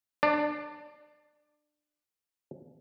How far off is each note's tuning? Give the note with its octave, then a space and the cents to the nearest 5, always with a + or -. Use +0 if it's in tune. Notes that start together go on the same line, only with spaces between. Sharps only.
D4 +25 D5 +0